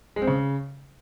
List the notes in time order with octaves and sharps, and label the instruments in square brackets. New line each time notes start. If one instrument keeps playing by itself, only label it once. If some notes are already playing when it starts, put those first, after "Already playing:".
[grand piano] G#3
C4
C#3